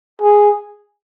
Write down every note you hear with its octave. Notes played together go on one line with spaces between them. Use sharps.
G#4